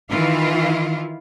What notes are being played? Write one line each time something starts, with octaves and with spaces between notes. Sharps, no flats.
D#3 E3 E4 F4 F5